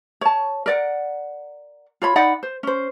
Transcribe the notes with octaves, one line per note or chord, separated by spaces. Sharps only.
C#5 A5
A#4 D5 F#5
F4 C#5 B5
D#4 D5 F#5 B5
C5
C#4 C5